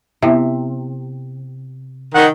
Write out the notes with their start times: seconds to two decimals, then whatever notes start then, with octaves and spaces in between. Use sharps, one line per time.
0.23 C3 B3 E4 E5
2.15 D#3 F#5